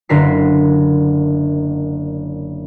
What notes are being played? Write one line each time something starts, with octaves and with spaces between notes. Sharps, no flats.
F#1 D3 F#4 A#4 B6 C7